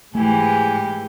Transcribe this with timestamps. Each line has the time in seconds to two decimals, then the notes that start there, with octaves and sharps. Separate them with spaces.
0.15 G#2 E3 G#3 A3 G4 G#5